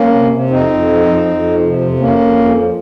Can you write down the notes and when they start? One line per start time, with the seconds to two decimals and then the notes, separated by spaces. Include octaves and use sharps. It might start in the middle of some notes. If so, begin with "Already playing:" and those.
Already playing: A#3 C#4
0.13 C3
0.31 C3
0.50 F2 C4 D#4
0.68 F2
0.87 F3
1.06 F2
1.25 F2
1.43 F3
1.63 C3
1.81 F2
1.99 F2 A#3 C#4
2.19 F2
2.37 F2
2.55 F3